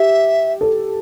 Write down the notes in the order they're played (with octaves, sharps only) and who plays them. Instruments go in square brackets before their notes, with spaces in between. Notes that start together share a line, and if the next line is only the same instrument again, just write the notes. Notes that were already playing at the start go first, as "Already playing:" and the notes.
Already playing: [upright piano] G4 [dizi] E5
[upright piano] A4